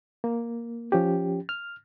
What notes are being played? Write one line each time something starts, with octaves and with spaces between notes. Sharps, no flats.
A#3
F3 C#4 G4
F6